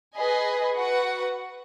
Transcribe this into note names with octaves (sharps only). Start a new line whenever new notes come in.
G#4 B4 D#5 G#5
F#4 B4 F#5